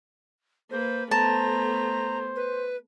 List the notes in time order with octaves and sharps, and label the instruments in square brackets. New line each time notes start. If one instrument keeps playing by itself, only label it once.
[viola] A#3 B4 [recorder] C5
[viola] A3 B3 [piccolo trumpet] C5 [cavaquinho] A5 [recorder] A#5
[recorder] B4